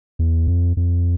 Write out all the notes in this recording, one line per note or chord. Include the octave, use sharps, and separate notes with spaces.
E2
F2
F2